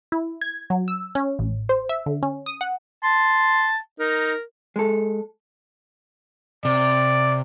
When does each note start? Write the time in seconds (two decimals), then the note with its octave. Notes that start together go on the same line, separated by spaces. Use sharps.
0.12 E4
0.41 G#6
0.70 F#3
0.88 E6
1.15 C#4
1.39 A1
1.69 C5
1.89 E5
2.06 D3
2.23 C#4
2.46 D#6
2.61 F#5
3.04 A5 C6
4.00 D#4 A#4
4.76 G#3 A4
6.65 C3 D5